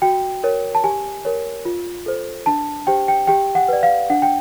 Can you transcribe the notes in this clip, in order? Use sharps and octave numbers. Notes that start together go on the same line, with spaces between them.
F#4 G5
A#4 C#5
A5
G4 G#5
A#4 C#5
F4
A4 C5
D4 A5
G4 C5 G5
G5
G4 G5
F#5
B4 D5
F5
D4 F#5
G5